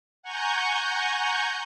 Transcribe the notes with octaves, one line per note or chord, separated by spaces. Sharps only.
F#5 G#5 A#5 C#6 G6